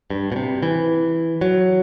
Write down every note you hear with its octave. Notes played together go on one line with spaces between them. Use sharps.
G2
B2
C3
E3
F#3